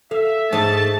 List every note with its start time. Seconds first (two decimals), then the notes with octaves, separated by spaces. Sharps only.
0.11 A4 E5 F5
0.53 G#2 G#3 A3 A5